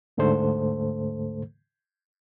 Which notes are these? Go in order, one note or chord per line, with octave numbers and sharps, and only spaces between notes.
D2 G#2 D3 A3 A4 C5